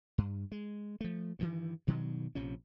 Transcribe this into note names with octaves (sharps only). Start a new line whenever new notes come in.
G2
G#3
F3 A3
G2 D#3 E3
G2 B2 D#3 F#3
A#1 C3 F3 C#4